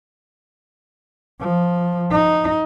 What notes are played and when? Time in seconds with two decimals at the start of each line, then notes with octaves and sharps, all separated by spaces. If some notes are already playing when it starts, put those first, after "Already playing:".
1.41 F3
2.11 D#4